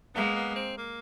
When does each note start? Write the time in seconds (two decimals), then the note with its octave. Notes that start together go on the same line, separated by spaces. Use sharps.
0.15 G#3 A#3 B3
0.35 B3
0.56 C4
0.78 A#3